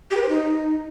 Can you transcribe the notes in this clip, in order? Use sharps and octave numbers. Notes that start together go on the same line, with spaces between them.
G4
B4
C5
D#4